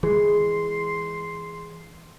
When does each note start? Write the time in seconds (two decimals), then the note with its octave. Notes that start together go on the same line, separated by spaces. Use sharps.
0.03 E3 G#3 G#4 C6